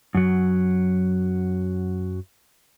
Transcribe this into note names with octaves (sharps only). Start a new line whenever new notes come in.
F#2 F#3